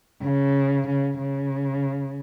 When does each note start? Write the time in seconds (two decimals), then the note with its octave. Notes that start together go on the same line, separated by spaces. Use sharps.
0.23 C#3
0.86 C#3
1.18 C#3